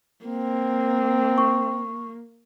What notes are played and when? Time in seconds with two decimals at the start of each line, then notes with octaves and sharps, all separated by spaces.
0.25 A#3 C4
1.38 C#6